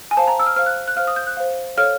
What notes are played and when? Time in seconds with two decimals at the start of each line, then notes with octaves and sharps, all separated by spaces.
0.11 G#5
0.17 C5 F5 A5
0.28 A#5
0.39 E6
0.46 F6
0.56 C5 F5 F6
0.66 F#6
0.88 F#6
0.97 C5 F5 F6
1.07 D#6
1.16 G6
1.27 F#6
1.37 C5 F5
1.77 A4 C#5 F5 F6